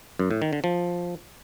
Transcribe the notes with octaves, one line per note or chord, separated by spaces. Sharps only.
F#2
A2
D#3
D3
F3